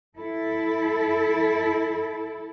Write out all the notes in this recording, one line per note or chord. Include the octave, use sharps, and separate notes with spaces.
E4 A4